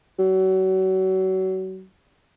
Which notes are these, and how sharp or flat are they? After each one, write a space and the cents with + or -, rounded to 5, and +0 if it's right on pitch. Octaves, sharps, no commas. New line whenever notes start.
F#3 +30